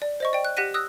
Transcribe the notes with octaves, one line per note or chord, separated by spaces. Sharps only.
D5
C5 D#5 C#6
D5 G5
F#6
G4 F#5 F#6 A#6 B6 D#7
D#6 E6 F#6 A#6